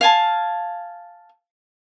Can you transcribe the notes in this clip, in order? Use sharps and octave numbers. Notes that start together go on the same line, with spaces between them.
F5 G#5 A5